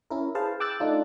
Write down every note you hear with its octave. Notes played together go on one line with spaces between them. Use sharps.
C#4 E4 A#4
G#4 B4 C5 F5 A5
G5 D6 E6 F#6 A6
A3 D4 D#4 F4